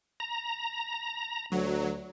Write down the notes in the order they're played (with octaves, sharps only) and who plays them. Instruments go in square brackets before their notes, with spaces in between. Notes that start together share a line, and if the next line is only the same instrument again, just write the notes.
[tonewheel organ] A#5
[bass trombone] D2 [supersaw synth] F#3